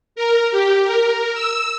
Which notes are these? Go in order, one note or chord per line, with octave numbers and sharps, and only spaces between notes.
A#4
G4
A#4
E6